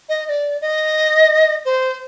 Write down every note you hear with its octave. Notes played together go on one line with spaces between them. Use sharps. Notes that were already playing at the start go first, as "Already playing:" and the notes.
D#5
D#5
D5
D#5
C5